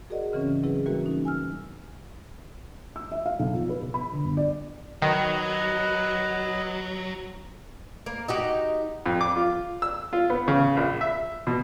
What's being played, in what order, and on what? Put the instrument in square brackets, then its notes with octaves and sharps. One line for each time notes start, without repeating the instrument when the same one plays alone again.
[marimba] F#4 G#4 A#4 D5 D#5 F#5
G#2 C#3 E3 C4 C#4
F#3 C4 E4 G#4 B4
E3 G3 A#3 F#4 A#4 B4
C#4 D#4
G#5 E6 F6
[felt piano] E6
E5
F5
B1
F3
B4
B2
B5
D3
G1
D5
[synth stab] D#3 [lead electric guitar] F#3 [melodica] B4 D#5
[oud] A#3
D#4 F#4 G4
[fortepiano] F2
D6
F4
E6
F4
B3
C#3
A#1
E5
B2